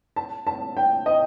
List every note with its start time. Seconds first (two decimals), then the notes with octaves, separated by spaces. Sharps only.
0.16 A5
0.47 A5
0.77 G5
1.06 D#5